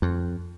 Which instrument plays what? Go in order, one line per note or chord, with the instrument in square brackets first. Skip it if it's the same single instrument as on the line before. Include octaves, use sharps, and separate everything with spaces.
[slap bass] F2